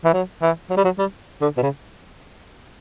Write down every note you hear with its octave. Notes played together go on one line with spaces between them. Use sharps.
E3
F#3
E3
F#3
G3
F#3
G3
D3
B2
C#3